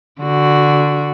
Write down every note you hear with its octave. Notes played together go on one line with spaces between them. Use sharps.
D3 F#4